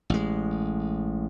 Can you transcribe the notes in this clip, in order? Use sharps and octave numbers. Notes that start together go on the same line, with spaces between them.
A1 G#3